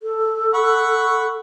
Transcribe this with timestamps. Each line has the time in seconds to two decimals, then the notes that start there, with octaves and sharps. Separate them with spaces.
0.03 A4
0.54 F#5 B5 C#6